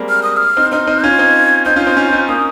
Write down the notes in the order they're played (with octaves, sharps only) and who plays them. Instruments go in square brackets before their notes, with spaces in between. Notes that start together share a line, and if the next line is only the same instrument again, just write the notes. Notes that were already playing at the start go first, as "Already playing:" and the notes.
Already playing: [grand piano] G3 G#3 A#3 C4
[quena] F6
D#6
F6
[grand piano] C4 D#4
[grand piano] C4 D#4 [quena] F6
[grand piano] C4 D#4
[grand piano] C#4 F4 [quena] G#6
[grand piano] C4 D#4
[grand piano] C4 D#4 [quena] G6
[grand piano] C#4 F4
C4 D#4
C#4 F4
F4
C4 D#4
[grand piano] A#3 C#4 [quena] D#6